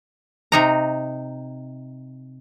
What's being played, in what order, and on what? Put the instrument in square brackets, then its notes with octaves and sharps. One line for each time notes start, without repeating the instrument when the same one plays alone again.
[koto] C3 D#4 A#5